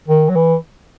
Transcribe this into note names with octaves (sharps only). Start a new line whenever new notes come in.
D#3
F#3
E3